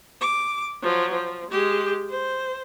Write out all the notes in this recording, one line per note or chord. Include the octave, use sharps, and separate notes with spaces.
D6
F3 F#3
F3
G#3 G4
C5